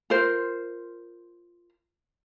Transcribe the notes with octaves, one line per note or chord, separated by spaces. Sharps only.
F4 A#4 C5